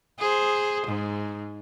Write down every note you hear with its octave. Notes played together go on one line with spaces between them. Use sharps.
G#4 C5
G#2